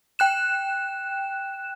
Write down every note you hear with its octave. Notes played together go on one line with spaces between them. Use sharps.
G5 F#6 E7